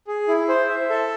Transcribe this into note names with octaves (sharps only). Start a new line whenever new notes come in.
G#4
E4
C5
E5
A4